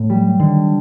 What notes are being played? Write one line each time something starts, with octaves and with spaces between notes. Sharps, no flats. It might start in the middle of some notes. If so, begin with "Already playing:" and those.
Already playing: A2
G3
D3 D#3